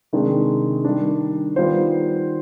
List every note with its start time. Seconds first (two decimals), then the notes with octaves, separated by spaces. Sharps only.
0.13 C3 D#3 G#3 D4
0.84 D#3 G3 D4
1.56 D#3 G3 B3 F4 C5